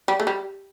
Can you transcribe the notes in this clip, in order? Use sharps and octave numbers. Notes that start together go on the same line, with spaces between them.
G3
A3
G3